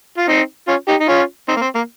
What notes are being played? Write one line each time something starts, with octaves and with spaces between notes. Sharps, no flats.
F4
C4 D#4
C#4 F4
D#4 G4
D#4
C#4 F4
C4 D#4
A#3
C4
A#3